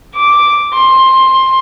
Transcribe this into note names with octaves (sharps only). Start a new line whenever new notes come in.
D6
C6